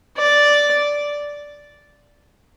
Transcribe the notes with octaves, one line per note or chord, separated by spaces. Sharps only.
D5